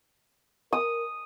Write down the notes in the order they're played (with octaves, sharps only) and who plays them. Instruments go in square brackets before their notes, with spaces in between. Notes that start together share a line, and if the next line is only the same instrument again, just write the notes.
[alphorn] A#4 [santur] D#6